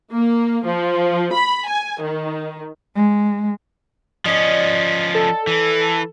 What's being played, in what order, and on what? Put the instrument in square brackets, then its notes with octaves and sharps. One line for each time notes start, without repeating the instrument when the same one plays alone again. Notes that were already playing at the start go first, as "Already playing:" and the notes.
[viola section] A#3
F3
B5
G#5
D#3
[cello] G#3
[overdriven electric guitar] F3 C#4 [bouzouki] D5 D#5
[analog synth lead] A4
[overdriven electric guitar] E3